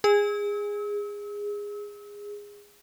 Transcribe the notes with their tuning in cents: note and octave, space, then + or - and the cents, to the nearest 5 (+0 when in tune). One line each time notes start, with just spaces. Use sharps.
G#4 -15 E6 -40